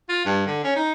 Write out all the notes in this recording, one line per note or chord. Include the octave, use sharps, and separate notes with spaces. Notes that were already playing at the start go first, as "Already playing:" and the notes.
F4
G2
D3
C#4
D#4